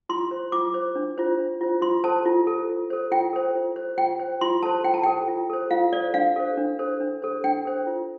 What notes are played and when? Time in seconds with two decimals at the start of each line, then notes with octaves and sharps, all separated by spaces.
0.09 F4 C6
0.31 C5
0.52 F4 D6
0.74 C5
0.95 D4
1.18 F4 C5
1.39 D4
1.61 F4 C5
1.82 F4 C6
2.04 A4 C5 A5
2.25 F4
2.47 A4 C5
2.69 F4
2.90 A4 C5
3.12 F4 G5
3.33 A4 C5
3.55 F4
3.76 C5
3.98 F4 G5
4.20 C5
4.41 F4 C6
4.63 A4 C5 A5
4.84 F4 G5
4.94 A5
5.04 A4 C5 G5
5.28 F4
5.50 A4 C5
5.71 F4 F5
5.93 A4 C5 D5
6.14 D4 F5
6.36 A4 C5
6.57 D4
6.79 A4 C5
7.00 D4
7.22 A4 C5
7.44 D4 G5
7.65 A4 C5
7.87 F4